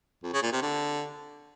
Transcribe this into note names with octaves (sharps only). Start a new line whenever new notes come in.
F2
C#3
A#2
C3
D3